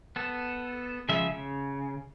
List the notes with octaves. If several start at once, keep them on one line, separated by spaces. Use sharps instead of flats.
B3 A4
C#3 F3 G#3 E5
C#3